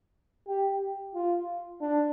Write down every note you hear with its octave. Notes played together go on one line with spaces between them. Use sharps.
G4
F4
D4